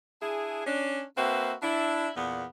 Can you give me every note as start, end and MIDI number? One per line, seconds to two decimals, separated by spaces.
0.22 0.64 62
0.22 0.64 64
0.22 0.64 68
0.67 1.03 61
0.67 1.03 62
1.18 1.54 58
1.18 1.54 60
1.18 1.54 66
1.18 1.54 71
1.18 1.54 76
1.63 2.10 62
1.63 2.10 64
2.16 2.45 40
2.16 2.45 46
2.16 2.45 59